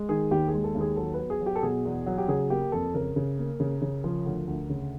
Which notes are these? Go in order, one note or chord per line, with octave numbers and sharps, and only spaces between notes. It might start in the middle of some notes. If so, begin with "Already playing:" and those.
Already playing: G#3
D#3 G#4
D#2 G4
G#4
G#3
A4
D#2
G#4
F#3 A4
B4
B3
G#4
F#3
G4
A4
B2 G#4
E2
F#3
G4
C#3 G#4
A#3 G4
F2 A4
C#3 A#4
C#3
A#3
C#3
C#3
F3
D2
D2
C#3